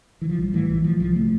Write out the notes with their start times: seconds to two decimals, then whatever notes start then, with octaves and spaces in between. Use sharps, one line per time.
0.22 E3
0.29 F3
0.38 A#1 G3
0.53 A2 E3
0.69 A#1 E3
0.84 A2 F3
1.00 C2 F3
1.15 C3 A3